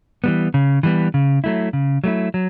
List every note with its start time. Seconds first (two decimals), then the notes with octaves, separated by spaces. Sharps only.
0.24 E3 G3 B3
0.54 C#3
0.83 E3 G3 B3
1.14 C#3
1.44 F#3 A3 E4
1.73 C#3
2.04 F#3 A3 E4
2.34 F#3